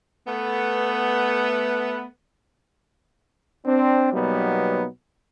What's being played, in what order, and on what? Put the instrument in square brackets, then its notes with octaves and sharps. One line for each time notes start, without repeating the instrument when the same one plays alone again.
[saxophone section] A3 B3
[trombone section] C4 D4
B2 F#3 G3 A#3 B3 D#4